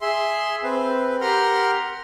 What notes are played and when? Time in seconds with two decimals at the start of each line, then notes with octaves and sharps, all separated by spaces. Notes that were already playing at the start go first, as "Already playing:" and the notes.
0.01 G#4 E5 C6
0.63 C4 B4
1.21 G4 A#4 F#5 A#5 C6 F6